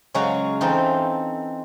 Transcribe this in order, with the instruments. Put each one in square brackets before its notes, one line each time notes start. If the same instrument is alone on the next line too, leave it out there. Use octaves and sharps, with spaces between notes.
[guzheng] C#3 F#3 G#3 F#4 C#5 F5
E3 C4 D#4 F4 A4